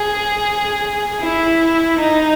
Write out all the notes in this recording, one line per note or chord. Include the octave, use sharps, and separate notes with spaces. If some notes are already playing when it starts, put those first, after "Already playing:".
Already playing: G#4
E4
D#4